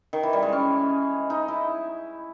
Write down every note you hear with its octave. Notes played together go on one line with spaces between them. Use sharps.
D#3
E3
G3
G#3
C#4
D#4
E4